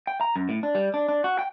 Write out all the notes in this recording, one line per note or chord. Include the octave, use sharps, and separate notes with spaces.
G5
A#5
F#2
A2
D4
G3
D4
D4
F#4
G5